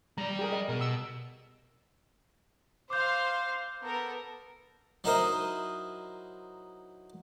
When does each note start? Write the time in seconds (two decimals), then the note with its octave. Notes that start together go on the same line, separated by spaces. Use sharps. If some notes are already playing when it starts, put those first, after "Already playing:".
0.18 G3 D5 A#5
0.39 G4 G#4 A#4
0.52 D#5
0.69 B2 A#4
0.81 E6
2.90 C5 F5 C6 D6 G6
3.82 B3 A4 A#4
5.04 F#3 D#4 E4 A#4 C5 D#6